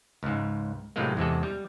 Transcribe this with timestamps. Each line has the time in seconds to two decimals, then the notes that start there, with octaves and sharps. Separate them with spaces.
0.23 C#2 G#2
0.96 A2 C3 F#3 G#3 A#3
1.17 E2 C3 G#3 A4
1.43 G3